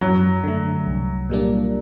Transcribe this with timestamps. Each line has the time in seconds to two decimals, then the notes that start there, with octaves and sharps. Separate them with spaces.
0.01 F#2 F#3
0.44 D3 A3
0.87 C2
1.30 A#2 G3 A#3 D4